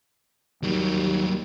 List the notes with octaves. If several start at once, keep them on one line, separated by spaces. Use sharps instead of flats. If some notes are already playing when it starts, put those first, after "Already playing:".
D#2 F#3 G3